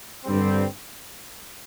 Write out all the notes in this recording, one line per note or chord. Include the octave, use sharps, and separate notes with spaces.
G2 D3 G3 C4